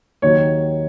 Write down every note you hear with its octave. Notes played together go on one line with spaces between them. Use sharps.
D#2 D#3 F#3 C#5